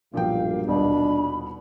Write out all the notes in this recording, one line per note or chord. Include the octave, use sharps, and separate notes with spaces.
B1 G2 A#2 F3 A#3 F5 G5
D#1 B2 D4 B5